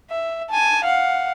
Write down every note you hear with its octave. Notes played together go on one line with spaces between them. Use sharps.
E5
G#5 A5
F5 F#5